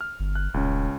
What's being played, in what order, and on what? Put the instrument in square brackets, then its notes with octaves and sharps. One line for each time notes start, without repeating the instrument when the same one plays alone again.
[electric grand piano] F6
[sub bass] G1
[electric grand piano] F#6
[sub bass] D#1 [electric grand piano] C#2 C#4